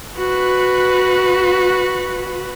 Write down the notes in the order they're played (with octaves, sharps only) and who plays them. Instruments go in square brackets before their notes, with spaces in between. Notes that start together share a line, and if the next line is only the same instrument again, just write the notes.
[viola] F#4 B4